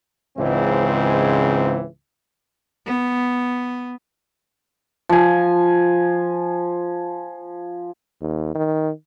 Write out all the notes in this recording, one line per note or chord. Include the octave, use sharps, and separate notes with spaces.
C#2 G#2 C#3 E3 C4
B3
F3 G#5
D#2
D#3